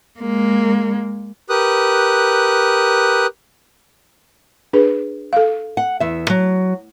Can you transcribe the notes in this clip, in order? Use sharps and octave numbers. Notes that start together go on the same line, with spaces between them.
G#3 A#3
G4 A#4 B4 D#6 F#6
D4 G#4 B4
A4 F5
F#5
E2 E5
F#3